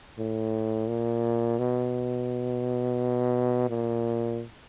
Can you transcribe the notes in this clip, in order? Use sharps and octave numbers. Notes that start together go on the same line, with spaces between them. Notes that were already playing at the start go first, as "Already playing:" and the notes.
A2
A#2
B2
A#2